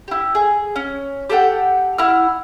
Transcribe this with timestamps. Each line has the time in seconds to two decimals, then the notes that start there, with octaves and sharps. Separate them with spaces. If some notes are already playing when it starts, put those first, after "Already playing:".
0.08 E4 G4
0.35 G#4
0.76 C#4
1.30 G4 A4 F#5 G5
1.98 E4 F#5 F6